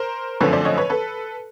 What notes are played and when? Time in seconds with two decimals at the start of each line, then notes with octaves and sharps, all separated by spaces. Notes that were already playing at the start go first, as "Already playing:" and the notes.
Already playing: A#4 C5
0.40 F#2 D3 F3 A3 C4 B4 C#5
0.53 C5 D5
0.65 C#5 D#5
0.77 B4 C#5
0.90 A4 B4